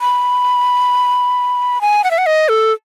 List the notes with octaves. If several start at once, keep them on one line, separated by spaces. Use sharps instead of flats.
B5
G#5
F#5
E5
F#5
D#5
A4